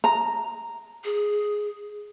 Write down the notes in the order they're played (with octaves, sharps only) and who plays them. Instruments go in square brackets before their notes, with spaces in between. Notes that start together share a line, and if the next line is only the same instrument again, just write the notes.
[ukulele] A#5
[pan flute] G#4